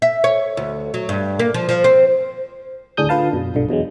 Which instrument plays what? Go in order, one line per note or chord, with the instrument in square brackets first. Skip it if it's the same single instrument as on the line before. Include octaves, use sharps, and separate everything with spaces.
[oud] E5
C#5
D2
F#3
G2
A#3
F3
F3
C4
[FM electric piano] D2 A2 D4 G#4 D#6 G6
D3 F4 B4 F5 A5
F#2 B2
B1 G2 D3
E2 B2 F#3 G#3